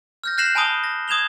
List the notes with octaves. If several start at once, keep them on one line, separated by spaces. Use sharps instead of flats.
F6 G6 A#6
F#6 G6 A#6 C7 E7 F#7
G#5 A5 B5 D#6 G7
A#6
D#6 G#6 E7 F7 G7